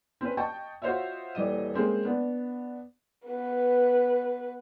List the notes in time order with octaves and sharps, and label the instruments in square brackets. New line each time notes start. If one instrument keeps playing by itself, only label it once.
[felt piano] C4 C#4 B4
D#5 G5 A5 C#6
F4 F#4 C5 C#5 D#5 E5
D#1 E3 G3 D#5 D#7
G#3 A#3 C4 C#4
B3 D4
[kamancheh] B3 B4